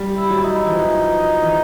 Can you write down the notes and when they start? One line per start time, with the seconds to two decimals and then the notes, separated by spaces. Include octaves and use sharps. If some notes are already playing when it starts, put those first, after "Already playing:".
Already playing: G3
0.17 E4
0.30 F#3
0.43 D#4
0.65 E3
0.71 F3
1.42 E3